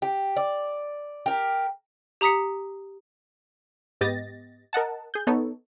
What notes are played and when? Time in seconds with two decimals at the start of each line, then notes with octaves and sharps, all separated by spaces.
0.02 G4
0.36 D5
1.26 G4 A#4
2.21 G4 A#5 D#6 B6 C#7
4.01 G#2 B3 G4 D#5 A6 A#6
4.73 A#4 D#5 F#5 A5
5.14 G#4 G6
5.27 B3 D#4 A4 C#5